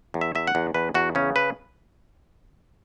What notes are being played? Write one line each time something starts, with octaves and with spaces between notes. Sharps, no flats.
E2
E5
E2 E5
F#5
E2
E2 B4
E2 F#4
C#3 C#4
B4